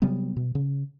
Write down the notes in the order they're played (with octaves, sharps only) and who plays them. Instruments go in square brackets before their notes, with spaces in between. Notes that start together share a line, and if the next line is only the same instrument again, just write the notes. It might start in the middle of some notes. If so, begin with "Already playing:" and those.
[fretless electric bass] C3 F#3 G3 B3
B2
C#3